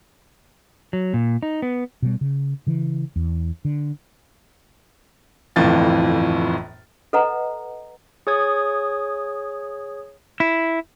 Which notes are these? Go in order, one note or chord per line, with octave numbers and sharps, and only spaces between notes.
F#3
A#2
D#4
B3
B2 F#3 G3
C#3
C#3 E3
E2
D3
G1 F2 A2 E3 F4 A6
A4 B4 D#5 F#5 A#5
G#4 C#5 D#6 G#6
E4